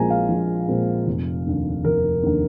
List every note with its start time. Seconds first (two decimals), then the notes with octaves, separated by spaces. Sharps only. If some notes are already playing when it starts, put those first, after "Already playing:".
Already playing: A#1 A#2 G#3 C4 G#5 A#5
0.10 F5
0.29 A#1
0.68 A#2 G#3 C4
1.07 F1
1.46 D#2 D3
1.84 F1 A#4
2.23 D#2 D3